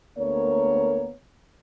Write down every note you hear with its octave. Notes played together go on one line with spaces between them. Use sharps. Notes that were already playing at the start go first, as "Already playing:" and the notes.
D2 A#3 B3 A#4 C#5